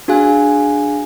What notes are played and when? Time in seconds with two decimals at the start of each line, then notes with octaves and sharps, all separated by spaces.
0.08 D4 F#4 G#4 F5 G#5 F#6